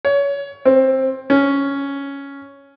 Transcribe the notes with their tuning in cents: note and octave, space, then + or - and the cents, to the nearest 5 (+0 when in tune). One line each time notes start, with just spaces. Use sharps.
C#5 +25
C4 +15
C#4 +5